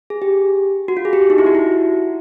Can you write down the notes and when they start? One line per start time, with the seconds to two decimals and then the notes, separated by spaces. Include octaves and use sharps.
0.10 G#4
0.22 G4
0.88 F#4
0.97 F4
1.05 G#4
1.13 G4
1.30 D#4
1.38 E4
1.46 F#4
1.55 E4